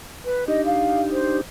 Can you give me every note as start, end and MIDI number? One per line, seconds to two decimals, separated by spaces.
0.25 0.45 71
0.48 1.41 62
0.48 1.41 63
0.48 1.41 67
0.48 0.64 75
0.65 1.00 77
1.12 1.37 72